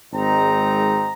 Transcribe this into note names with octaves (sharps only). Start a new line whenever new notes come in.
G#1 G#3 C4 D#4 A#5